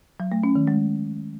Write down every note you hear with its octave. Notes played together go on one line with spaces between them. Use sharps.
F#3
A3
C#4
D#3
G#3